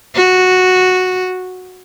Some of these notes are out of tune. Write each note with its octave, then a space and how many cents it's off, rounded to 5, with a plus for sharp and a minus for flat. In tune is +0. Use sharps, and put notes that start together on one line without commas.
F#4 -5